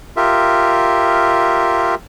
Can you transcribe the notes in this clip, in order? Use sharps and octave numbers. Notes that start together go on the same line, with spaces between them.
F4 G4 A#4 E5